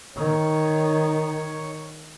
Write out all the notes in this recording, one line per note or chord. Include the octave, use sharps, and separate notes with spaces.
D#3 C#5